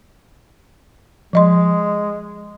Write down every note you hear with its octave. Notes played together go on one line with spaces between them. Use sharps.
F3 G#3 D#5 C6